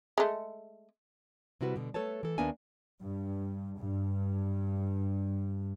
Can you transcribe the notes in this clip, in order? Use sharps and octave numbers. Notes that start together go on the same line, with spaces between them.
G#3 A3
C3 G3 E4 F#4 A#4 B4
B2 D3
A3 A4 B4 C#5 A5
E3 A4
D#2 A#3 B3 D4 E5 G#5
G2
G2